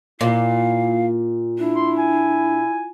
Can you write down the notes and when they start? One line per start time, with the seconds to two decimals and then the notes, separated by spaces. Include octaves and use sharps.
0.21 A#2 E4 F5
1.59 D4 E4
1.76 C6
1.98 G#5